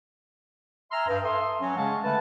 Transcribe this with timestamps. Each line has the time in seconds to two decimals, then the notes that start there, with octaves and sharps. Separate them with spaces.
0.91 E5 G#5 A#5 C6 E6 F6
1.07 G2
1.23 A4 E5 C6 D#6
1.60 F#3 C#4
1.76 C#3 G#3 C#4 F5 F#5 A5
2.03 D3 A3 B4 A5